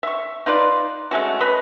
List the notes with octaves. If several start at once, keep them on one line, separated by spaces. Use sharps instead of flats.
E5 C#6
D#4 F4 B4 D5
G#3 A3 C#4 F#4
B4 D#5 B5